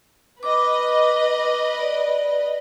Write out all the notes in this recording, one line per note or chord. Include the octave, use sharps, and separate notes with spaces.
B4 D#5 D6
D5